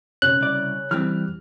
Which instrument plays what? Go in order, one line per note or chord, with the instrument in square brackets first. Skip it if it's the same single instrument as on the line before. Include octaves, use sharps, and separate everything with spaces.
[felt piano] C#3 C#4 [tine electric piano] F#6
[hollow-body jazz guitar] C2 D5
[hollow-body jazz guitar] E3 G3 C4 [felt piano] F6